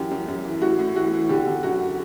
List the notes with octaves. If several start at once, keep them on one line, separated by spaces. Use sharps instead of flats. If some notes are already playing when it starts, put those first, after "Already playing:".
Already playing: F#2 E3 G4
F#2
F#2
E3
A2 F#4
A2
E3 F#4
E3
D3 G4
D3
F#2 F#4